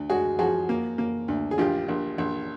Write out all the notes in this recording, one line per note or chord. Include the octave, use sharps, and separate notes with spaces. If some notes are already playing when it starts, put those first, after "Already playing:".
Already playing: D2
G#3 F#4 G#4
F3 F#4 G#4
A#3
A#3
D2
G#4
A#1 F4 G4
A#1
A#1